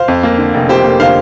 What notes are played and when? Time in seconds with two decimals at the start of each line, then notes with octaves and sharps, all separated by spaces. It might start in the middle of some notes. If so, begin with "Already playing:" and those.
Already playing: C5 F5
0.08 F2
0.23 A#3
0.38 D3
0.54 F1
0.69 F2 G4 C5
0.85 A#3
1.00 D3 C5 F5